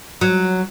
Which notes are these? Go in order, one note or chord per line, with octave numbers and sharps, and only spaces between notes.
F#3